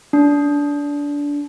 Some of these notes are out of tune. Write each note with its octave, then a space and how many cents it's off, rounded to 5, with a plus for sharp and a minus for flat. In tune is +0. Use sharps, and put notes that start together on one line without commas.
D4 -20